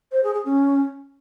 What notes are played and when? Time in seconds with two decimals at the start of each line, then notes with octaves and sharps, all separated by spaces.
0.12 C5
0.23 G#4
0.34 G#4
0.45 C#4